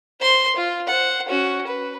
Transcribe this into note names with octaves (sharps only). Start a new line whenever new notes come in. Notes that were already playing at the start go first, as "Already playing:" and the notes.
C5 C6
F4
C5 F#5
C#4 F#4
B4